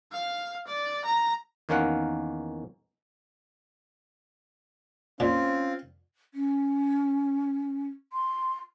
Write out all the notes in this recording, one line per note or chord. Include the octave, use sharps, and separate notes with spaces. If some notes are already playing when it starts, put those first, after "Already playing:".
F5
D5
A#5
E2 D#3 A#3 C#4 F5 F#5
A#2 C4 C#4 F4
C#4
C6